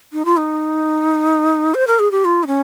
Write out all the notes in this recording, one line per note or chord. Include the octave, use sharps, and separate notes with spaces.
D#4
F4
D#4
C5
A#4
G#4
G4
F4
D#4
C#4